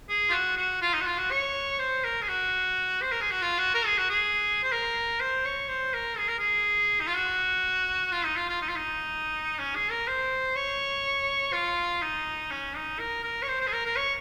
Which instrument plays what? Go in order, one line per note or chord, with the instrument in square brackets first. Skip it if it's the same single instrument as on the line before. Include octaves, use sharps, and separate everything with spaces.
[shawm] G#4
F4
F#4
F#4
F4
D#4
F#4
F4
F#4
C#5
C5
A#4
G#4
F#4
C5
A#4
G#4
F#4
F4
F#4
A#4
G#4
F#4
G#4
C5
A#4
C5
C#5
C5
A#4
G#4
A#4
G#4
D#4
F4
F#4
F4
D#4
F4
F4
D#4
F4
D#4
C#4
G#4
A#4
C5
C#5
F4
D#4
C#4
D#4
A#4
A#4
C#5
C5
C5
G#4
A#4
A#4
C#5